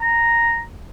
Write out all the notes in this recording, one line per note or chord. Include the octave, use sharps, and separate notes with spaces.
A#5